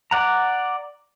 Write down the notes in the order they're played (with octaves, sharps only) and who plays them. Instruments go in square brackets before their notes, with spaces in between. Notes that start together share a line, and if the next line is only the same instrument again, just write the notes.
[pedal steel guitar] D5 F#5 A#5